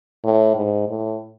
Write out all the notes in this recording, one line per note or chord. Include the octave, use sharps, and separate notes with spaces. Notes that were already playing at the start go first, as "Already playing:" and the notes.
A2
G#2
A2